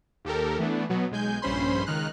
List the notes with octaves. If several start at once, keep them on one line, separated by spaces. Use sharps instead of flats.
D#2 G4 A4 A#4
E3 A3 B3 D4
B2 F#3 B3
B1 G#3 G#5 G6
A#1 G2 C#4 C5 B5 C6
C#2 D#3 D#4 F6 F#6